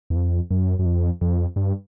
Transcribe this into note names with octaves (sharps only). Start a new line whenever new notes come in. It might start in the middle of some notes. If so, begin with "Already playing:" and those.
E2
F2
F#2
F#2
F2
F2
G2